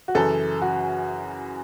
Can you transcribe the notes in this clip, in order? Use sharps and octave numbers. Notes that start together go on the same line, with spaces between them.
F#4
F#2 C#3 E3 A4
F#4